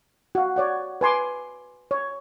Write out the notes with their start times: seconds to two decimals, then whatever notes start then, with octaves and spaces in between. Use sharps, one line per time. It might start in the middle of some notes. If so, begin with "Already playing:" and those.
0.35 F#4 F5
0.56 C#5 D5 F#5
1.01 B4 G#5 C6 D6
1.91 C#5